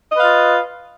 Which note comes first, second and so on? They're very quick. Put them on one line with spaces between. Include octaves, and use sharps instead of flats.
D#5 B4 F5 F4